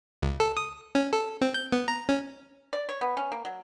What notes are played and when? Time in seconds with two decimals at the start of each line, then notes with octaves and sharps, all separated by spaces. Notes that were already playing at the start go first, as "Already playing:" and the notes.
0.22 C#2
0.40 A4
0.57 D#6
0.95 C#4
1.13 A4
1.41 C4
1.54 G6
1.72 B3
1.88 A#5
2.09 C#4
2.73 D5
2.89 C#5
3.01 B3
3.17 C#4
3.32 A#3
3.45 F#3